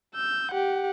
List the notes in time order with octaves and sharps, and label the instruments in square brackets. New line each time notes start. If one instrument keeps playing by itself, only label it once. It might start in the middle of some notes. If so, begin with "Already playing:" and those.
[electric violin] E6 G6
G4 F#5